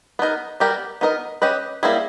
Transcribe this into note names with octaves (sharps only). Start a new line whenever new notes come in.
B3 D#4 A#4
G3 B3 G4 A#4
B3 D#4 A#4 D#5
C#4 G4 B4 D#5
G3 A#3 C#4 E4 G#4